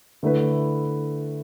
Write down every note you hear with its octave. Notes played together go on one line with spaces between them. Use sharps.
D3 A3 E4 B4